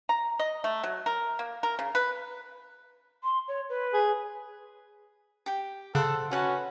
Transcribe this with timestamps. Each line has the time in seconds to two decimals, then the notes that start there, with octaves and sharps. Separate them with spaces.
0.09 A#5
0.39 D#5
0.64 A3
0.83 F#3
1.06 A#4
1.39 A#3
1.63 A#4
1.79 C#3
1.95 B4
3.24 C6
3.48 C#5
3.69 B4
3.93 G#4
5.46 G4 G5
5.95 C#3 A4 C5 F#5
6.31 C#4 F#4 B4 F#5 A5